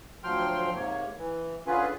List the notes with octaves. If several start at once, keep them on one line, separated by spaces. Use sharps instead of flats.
D2 F3 F#3 G5 C6 F6
G#2 C3 A#3 C#5
E3
D3 C#4 F4 G#4 B4